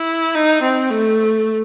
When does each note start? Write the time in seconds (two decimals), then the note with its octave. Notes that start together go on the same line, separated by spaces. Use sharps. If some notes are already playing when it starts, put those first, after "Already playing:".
Already playing: E4
0.35 D#4
0.63 C4
0.90 A3